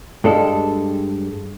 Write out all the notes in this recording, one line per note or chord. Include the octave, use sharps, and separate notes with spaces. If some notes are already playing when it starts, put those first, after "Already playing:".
G2 G#3 A4